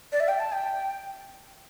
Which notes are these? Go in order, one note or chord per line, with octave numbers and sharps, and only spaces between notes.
D5
E5
G5
A5
G5